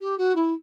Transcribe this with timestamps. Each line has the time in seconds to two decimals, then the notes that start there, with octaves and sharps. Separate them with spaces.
0.01 G4
0.18 F#4
0.35 E4